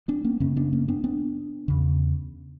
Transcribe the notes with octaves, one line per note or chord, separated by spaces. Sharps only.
B3 D4
A#3 C#4
F#2 C#3 A#3 C#4
B3 D4
A#3 C#4
B3 D4
B3 D4
E2 C#3